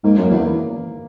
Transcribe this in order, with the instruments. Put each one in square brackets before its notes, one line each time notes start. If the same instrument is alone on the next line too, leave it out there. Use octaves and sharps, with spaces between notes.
[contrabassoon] G#2 [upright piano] A#3
[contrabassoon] F#2
[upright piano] A#3
[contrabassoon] E2
[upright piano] A#3